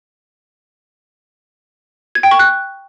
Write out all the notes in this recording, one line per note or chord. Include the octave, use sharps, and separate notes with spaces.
G#6
G5
C#6
F#6